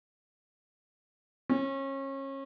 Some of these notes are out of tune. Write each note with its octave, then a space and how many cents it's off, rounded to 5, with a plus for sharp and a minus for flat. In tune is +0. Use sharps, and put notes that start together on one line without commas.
C#4 -30